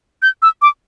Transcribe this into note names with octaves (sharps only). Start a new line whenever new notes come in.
G6
E6
D6